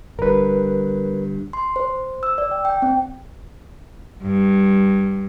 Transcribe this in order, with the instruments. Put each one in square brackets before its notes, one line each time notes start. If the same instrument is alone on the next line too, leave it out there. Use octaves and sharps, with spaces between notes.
[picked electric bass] G1 G2 [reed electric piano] A#4 B4
[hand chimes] C6
C5
E6
D5
G5
G5
C4
[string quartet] G2